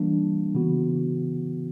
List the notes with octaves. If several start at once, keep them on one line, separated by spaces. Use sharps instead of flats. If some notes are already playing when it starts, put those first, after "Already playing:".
Already playing: E3 G3 A#3 D4
C#3 E3 B3 F#4